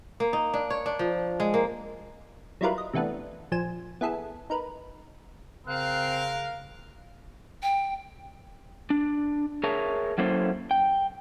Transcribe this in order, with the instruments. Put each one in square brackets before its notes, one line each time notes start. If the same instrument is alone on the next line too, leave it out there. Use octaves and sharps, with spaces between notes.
[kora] A#3
D#4
D4
C#5
D4
F3
G#3
A#3
[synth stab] F#3 G3 E4 F4 A#4 B4
D#5
C3 E3 A3 B3 D4
A#1 F3 G#5 E7
B3 E4 G#4 A4
D#4 A#4 B4
[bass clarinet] C#3 [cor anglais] C4 [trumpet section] A#4 F5 [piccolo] F#6
[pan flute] G5
[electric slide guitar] D4
G#4 A#4 C#5 E5 A5
F#3 A#3 C#4 E4 A4 C5
G5